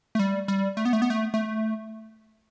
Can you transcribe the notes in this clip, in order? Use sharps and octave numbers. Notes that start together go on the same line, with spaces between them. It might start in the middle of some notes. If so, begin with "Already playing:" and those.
A3
G3
G3
A3
B3
A3
B3
A3
A3